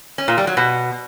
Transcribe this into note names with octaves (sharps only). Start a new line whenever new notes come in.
C#4
A#2
G3
F#3
B2